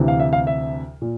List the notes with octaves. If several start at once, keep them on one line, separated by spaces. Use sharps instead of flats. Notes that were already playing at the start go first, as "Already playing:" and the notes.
Already playing: D2 C3 E3
F5
E5
F5
E5
A#2